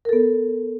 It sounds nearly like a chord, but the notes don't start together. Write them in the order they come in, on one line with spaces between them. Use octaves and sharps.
A#4 A4 B3